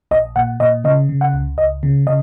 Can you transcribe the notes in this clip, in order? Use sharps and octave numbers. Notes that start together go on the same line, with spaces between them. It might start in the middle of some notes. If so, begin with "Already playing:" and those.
A#1 D#5
A#2 F#5
A#2 D#5
C#3 D#5
C#3
F#5
C#2
C#2 D#5
C#3
C#3 D#5